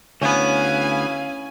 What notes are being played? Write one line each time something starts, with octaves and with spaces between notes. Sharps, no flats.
D2 B3 C#4 E4 F5 G#5